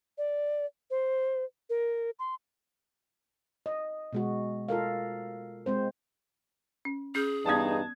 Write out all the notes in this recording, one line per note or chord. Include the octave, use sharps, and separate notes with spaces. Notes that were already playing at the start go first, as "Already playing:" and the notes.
D5
C5
A#4
C6
D#5
B2 G#3 F#4
F4 A4 A#4 F5
G#3 C4 C5
C#4
C#4 G#4 F6 G6
E2 G2 B3 D#4 D5 A5 D#6 G#6